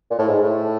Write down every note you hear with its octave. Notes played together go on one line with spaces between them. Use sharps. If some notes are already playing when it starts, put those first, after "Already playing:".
A#2
A2
G#2
A2